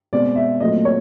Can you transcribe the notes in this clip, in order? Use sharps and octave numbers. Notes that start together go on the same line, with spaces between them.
B2 G#3 C4 D5
E5
A#2 F#3 A3 C4 D#5
C#5